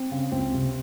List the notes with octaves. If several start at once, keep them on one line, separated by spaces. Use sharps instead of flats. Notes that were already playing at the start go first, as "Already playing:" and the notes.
Already playing: C4
C#3
C#2 C4
C3